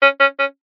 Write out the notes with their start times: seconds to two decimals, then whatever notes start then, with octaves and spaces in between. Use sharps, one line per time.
0.02 C#4
0.20 C#4
0.39 C#4